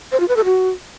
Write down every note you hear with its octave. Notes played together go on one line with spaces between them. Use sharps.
C5
F4
B4
A4
F#4